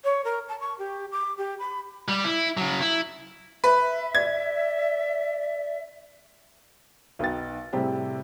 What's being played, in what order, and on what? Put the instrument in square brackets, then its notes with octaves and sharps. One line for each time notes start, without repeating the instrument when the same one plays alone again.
[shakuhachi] C#5
A#4
A5
C#6
G4
D6
G4
B5
[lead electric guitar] G3
E4
C#3 F#3
E4
[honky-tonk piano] B4 [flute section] E5
[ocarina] D5 [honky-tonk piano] G#6
[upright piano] B1 B3 D#4 G5 A6
A2 C3 G3 C4 G4 G#4